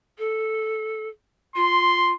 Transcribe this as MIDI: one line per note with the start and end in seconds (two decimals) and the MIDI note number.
0.19 1.08 69
1.56 2.13 65
1.56 2.15 84